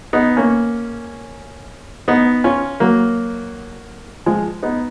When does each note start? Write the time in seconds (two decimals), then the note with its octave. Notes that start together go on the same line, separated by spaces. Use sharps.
0.13 B3 D#4
0.37 A#3 C#4
2.08 B3 D#4
2.44 C#4 F4
2.80 F#3 A#3
4.26 F3 G#3
4.62 B3 D#4